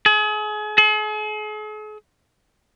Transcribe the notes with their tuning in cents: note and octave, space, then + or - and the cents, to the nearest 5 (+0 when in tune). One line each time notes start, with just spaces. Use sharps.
G#4 +35
G#4 +45